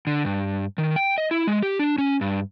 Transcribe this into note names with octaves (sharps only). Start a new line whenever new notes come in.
D3
G2
D#3
G5
D#5
E4
G#3
G4
D4
C#4
G2